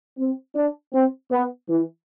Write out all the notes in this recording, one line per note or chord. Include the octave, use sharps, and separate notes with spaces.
C4
D4
C4
B3
E3